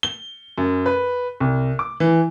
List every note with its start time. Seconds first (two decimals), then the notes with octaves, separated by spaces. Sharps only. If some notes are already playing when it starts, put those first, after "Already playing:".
0.03 G7
0.58 F#2
0.86 B4
1.40 C2
1.79 D6
2.00 E3